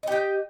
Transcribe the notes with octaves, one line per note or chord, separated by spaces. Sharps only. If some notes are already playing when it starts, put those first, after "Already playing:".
G4 D#5 G5